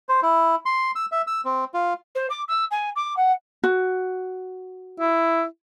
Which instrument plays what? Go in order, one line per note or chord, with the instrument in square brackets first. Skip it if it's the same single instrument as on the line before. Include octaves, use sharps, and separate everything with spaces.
[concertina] C5
E4
C6
E6
E5
E6
C4
F4
[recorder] C5
D6
E6
G#5
D6
F#5
[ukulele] F#4
[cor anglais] E4